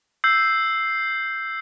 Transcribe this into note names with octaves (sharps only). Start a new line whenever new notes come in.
E6 G6 C7